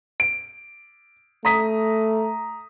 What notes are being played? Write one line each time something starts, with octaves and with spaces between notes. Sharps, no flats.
D7
A3 A#5 D#6 B6